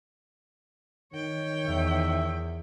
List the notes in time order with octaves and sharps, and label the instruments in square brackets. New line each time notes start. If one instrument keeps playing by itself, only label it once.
[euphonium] D#3 [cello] C#5 G5
[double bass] E2 [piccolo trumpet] E5